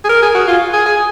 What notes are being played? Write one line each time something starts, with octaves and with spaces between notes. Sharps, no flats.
G#4
A#4
G#4
F#4
F4
G#4
G#4